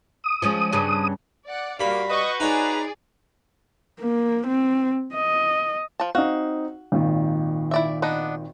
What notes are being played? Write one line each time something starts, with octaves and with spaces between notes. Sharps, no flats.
D#6
F3 G#3 C#4
G2 C#3 D4
D5 F#5
G2 A#3 F#4 F5 B5
F#4 B4 D#5 C#6 G6 A#6
D#4 G#4 C#5 D5 A#5
A#3
C4
D#5
F3 A5
C4 D#4 F#4 F5
G#1 A#2 D#3
E4 D5 E5
B3 D4 D#4